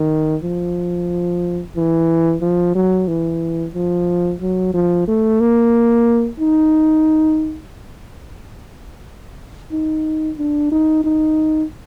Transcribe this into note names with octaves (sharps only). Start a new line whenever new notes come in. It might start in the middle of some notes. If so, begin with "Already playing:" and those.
Already playing: D#3
F3
E3
F3
F#3
E3
F3
F#3
F3
A3
A#3
D#4
D#4
D4
D#4
D#4